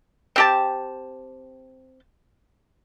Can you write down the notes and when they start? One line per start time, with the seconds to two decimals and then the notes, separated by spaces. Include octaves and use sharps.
0.36 C4 G4 A5